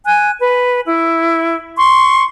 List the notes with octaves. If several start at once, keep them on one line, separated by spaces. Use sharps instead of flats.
G#5 F#6
B4
E4
C6 C#6